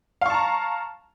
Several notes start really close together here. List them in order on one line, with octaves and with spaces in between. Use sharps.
F5 C#6 A5 A#5